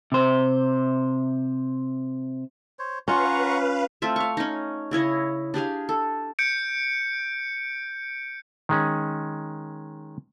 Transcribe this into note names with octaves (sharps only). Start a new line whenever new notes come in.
C3 C5
C5 C#5
C#4 F4 B4 F5 F#5 A#5 C#6
A3 C4 F4 E5
F5 C#6
C#4 D#4
C#3 E4 C#5 D#5
D4 G4 G#4 F5
A4
G6 C#7 D7
D#3 G#3 C#4